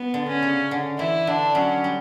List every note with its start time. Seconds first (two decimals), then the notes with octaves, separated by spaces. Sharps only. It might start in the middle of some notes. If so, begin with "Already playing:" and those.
Already playing: B3
0.14 D3
0.28 C#4
0.43 C#3
0.71 D3
0.98 E3 E4
1.27 D3 D4
1.55 F#3 C#4
1.84 G3